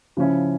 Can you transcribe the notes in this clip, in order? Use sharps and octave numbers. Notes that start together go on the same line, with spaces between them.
C#3 F3 C#4 E4